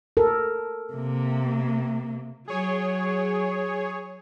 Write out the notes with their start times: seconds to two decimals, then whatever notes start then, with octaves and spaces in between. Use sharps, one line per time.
0.17 A4 A#4
0.93 C3 A#3
2.48 F#3 G#4 C#5